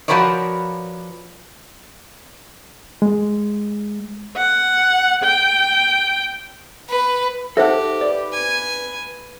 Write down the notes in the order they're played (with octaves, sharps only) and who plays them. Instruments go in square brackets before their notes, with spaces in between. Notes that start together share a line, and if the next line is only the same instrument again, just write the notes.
[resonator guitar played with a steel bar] F3 F#4 A#4 B4 C#5 D5
[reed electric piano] G#3
[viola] F#5
G5
[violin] B4
[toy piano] D#4 C5 E5 [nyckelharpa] G4 [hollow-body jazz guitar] A4 F#5
[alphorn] B4 [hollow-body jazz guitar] D5
[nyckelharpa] G#5